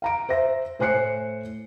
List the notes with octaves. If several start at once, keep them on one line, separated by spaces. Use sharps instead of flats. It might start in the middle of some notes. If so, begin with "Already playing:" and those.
F5 A#5 D7
C5 E5 A#6
A2 C5 G#5 F#6 C7 C#7